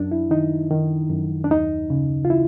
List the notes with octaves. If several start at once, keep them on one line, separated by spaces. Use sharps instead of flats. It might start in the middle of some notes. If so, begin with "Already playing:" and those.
Already playing: F#2 D4
E4
D#3 D#4
D#3
F#2
D4
D#2 D#4
C#3
F4
E4